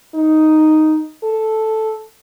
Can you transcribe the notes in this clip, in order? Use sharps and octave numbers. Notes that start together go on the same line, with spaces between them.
D#4
A4